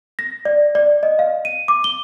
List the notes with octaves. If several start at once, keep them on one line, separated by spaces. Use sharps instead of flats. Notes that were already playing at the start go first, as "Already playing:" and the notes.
A#6
D5
D5
D#5
F5
D#7
D6
G7